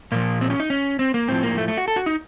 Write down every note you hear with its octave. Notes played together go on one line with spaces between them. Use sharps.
A#2 F3 A#3
C4
C#4
D#4
C#4
C4
A#3
A2 F3 C4
A#3
A3
A3
F#4
A4
F#4
D#4